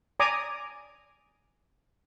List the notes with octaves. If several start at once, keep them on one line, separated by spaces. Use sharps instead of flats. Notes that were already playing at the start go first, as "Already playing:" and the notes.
D5 G#5 A#5 D6 D#6